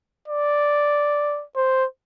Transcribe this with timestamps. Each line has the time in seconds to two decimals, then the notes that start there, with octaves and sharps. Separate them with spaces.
0.28 D5
1.56 C5